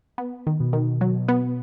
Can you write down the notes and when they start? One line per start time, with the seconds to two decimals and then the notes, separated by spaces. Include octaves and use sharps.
0.18 B3
0.47 D#3
0.60 B2
0.73 D#3
1.01 F#3
1.28 B3